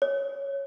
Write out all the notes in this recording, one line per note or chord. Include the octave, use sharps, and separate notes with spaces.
C#5